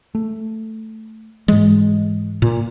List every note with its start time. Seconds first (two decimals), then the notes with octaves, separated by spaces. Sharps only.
0.15 A3
1.48 G#2 E3 G#3
2.42 A#2